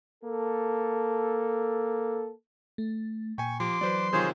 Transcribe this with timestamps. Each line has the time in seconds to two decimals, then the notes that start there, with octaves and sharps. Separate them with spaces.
0.24 A#3 A4
2.78 A3
3.38 A#2 G5 G#5 C#6
3.60 F3 G4 C6 D6
3.81 E3 F#3 B4 C5 D5
4.13 C3 D#3 F4 G#4 C5 C#5